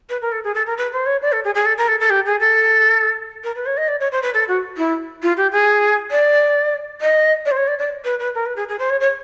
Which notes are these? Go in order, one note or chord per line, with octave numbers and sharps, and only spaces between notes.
B4
A#4
A4
G#4
A4
A#4
B4
C5
C#5
D5
A4
G#4
G#4
A4
A#4
A4
A4
G4
G#4
A4
A#4
B4
C#5
D#5
D5
C#5
C5
B4
A4
F#4
E4
F4
G4
G#4
D5
D#5
D5
C5
C#5
D5
D5
B4
B4
A#4
B4
G#4
G#4
C5
C#5
C#5